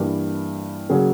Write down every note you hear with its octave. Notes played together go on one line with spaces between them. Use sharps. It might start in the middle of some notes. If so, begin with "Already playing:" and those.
Already playing: G2 E3 G3 A#3 G4
C#3 F#3 A#3 G#4